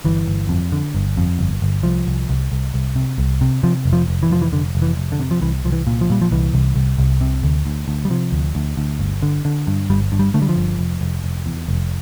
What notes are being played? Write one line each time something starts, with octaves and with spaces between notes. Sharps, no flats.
G1 E3
G1
F2
D3
G1
F2
G1
G1
C2 F3
C2
C2
C2
C2
C3
C2
C3
C3 F3
F1
F3
F1
E3
F1 F3
E3
F1 D3
F1
E3
F1
D3
C3
F3
C2 E3
C2 F3
E3
A#2
F3
A#2 G3
F3
C2 E3
C2
C2
C2
C3
D2
D2
D2
G3
C3 F3
D2
D2
D2
G1
D3
D3
G2
G1 G3
G2
G3
D3 A3
G3
F3
G1
F1
F1
F1
E2
F1